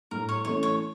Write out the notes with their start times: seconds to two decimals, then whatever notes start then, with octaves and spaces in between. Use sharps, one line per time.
0.11 A2 A#4
0.29 C#5
0.45 E3 A3 C#4 C#5
0.63 C#5